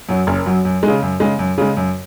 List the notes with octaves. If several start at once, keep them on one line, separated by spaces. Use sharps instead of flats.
F#2 F#3
F#1
F#2 F#3
F#2
C#3 G#3
F#2
C#3 G#3
F#2
C#3 G#3
F#2